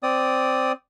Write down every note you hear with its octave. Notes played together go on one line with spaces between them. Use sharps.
C4 D5 D#6